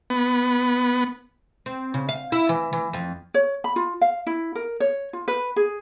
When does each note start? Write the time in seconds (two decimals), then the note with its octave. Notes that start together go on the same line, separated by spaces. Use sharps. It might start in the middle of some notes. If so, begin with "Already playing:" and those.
0.10 B3
1.66 C4
1.94 C#3
2.09 F5
2.32 E4
2.49 E3
2.73 E3
2.93 F2
3.34 C#5
3.64 B5
3.76 F4
4.01 F5
4.27 E4
4.55 A#4
4.80 C#5
5.13 F4
5.28 B4
5.56 G#4